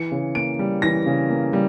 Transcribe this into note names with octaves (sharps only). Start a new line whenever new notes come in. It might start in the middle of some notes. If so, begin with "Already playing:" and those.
Already playing: E3 C#7
C#3
A#3 D7
G3
E3 A#6
C#3
A#3
G3